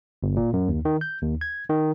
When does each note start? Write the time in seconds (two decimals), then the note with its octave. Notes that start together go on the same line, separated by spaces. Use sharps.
0.23 G1
0.37 A#2
0.53 F#2
0.68 D#2
0.85 D#3
1.01 G6
1.22 D#2
1.41 G#6
1.70 D#3